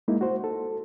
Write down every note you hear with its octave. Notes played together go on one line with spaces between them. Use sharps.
G#3 A#3 D#4 E4
F#4 C5
A4